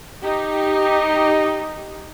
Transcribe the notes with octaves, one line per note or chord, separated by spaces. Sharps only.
D#4 G4